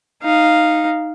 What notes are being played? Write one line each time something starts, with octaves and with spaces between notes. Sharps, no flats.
D#4 F5